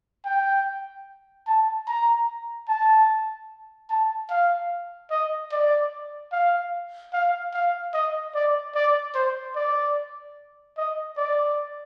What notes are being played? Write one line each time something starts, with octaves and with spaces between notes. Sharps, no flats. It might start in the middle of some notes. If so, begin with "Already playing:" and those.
G5
A5
A#5
A5
A5
F5
D#5
D5
F5
F5
F5
D#5
D5
D5
C5
D5
D#5
D5